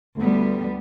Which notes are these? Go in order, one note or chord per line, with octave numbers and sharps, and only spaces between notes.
D2 G3 A3 B3